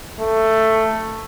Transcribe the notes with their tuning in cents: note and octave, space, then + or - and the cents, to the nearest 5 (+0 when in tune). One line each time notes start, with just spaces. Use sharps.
A3 +10